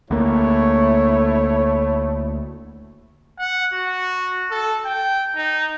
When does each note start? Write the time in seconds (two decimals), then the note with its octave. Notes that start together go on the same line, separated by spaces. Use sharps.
0.11 D2 A3 A#3 E4 C#5
3.39 F#5
3.73 F#4
4.51 A4
4.85 G5
5.36 D#4